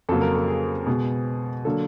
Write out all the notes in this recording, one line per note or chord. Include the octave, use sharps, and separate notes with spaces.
F2 C#3 F#3 A#3 A4
A#4
A4
G#4
B2 G#3 B3
D3 F#3 A#3 A4